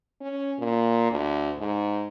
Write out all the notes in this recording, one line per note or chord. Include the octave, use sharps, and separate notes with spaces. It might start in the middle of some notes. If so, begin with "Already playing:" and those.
C#4
A#2
D2
G#2